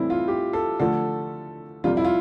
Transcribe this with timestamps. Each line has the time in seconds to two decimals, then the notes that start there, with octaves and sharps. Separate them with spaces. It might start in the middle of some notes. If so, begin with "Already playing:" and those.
Already playing: A2 E3 G3 C4 E4
0.10 F4
0.28 G4
0.53 A4
0.80 D3 F3 A3 A4
1.84 F2 C3 G3 F4
1.97 E4
2.04 F4